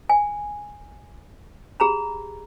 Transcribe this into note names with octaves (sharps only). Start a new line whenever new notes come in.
G#5
G4 G#4 A#5 B5